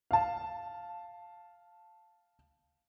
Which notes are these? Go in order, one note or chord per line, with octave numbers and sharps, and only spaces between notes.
F5 A5